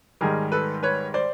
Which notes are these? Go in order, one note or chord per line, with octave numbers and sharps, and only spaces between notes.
G#2 D#3 G3 G#4 A#4
A4 B4
B4 C#5
C5 D5